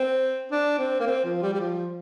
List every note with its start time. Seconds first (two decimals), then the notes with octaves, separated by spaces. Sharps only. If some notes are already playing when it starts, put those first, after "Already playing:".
Already playing: C4
0.52 D4
0.79 C4
1.00 A#3
1.07 C4
1.25 F3
1.42 G3
1.54 G3
1.60 F3